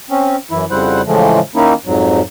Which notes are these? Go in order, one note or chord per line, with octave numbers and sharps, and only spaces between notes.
C4 C#4
F#2 E3 E4
F2 C#3 G3 E4 C5 F#5
A2 C#3 E3 F3 G#3 A3
D#3 A#3 C#4 D#4 E4
F2 G#2 F#3